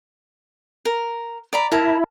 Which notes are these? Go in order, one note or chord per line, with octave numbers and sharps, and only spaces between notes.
A#4
D5 A#5 B5
E4 A#4 A5